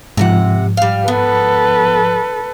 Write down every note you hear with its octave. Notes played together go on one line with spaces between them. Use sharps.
G#2 C3 F3 G#4 F#5
G3 F5
B3 A4 B4